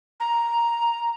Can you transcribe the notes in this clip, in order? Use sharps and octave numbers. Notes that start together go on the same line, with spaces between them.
A#5